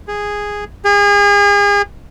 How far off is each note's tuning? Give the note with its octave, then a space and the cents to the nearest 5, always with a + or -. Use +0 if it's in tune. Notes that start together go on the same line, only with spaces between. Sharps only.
G#4 -10
G#4 -35